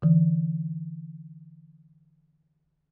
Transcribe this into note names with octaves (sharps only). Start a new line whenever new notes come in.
D3 E3